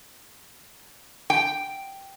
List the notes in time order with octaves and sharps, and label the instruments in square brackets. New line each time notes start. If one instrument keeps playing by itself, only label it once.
[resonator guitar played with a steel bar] G5